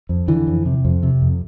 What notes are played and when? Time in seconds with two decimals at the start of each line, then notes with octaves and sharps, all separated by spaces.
0.09 F2
0.28 D3 E3
0.47 F2
0.66 C3
0.85 F2
1.03 C3
1.22 F2